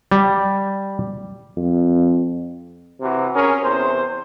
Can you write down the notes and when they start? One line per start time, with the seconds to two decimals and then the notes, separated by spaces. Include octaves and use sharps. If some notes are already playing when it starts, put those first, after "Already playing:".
0.11 G3
1.57 F2
3.00 C3 E3 F#4
3.33 C#4 G#4 A#4
3.62 E2 C3 C5